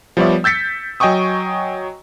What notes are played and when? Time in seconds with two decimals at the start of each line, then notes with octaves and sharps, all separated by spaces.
0.17 F3 G3 B3 C#5 D5 E5
0.44 E6 G6 A6 B6 C#7
1.00 F#3 D#5 G5 G#5 C#6 D#6